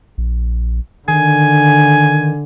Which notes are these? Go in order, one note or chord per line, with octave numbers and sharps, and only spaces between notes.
A#1
D3 D#3 G#5